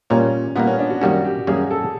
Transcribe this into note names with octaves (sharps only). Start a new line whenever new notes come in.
A#2 G3 A#3 C#4
A#2 G3 A#3 B3
C#4
D4
F#4
F#2 D#3 G3 A#3 C#4 F#4
G4
F#2 D#3 G3 A#3 C#4 G#4
A4